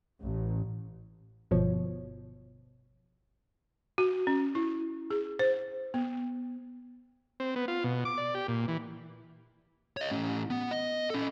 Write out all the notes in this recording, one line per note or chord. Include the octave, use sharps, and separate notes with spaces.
A1
G1 B2 F3 C#5
F#4
C#4
E4
G#4
C5
B3
C4
B3
F4
B2
D6
D5
G4
A#2
E3
C#5 D#5
A2 C#4
B3
D#5
C#4 A4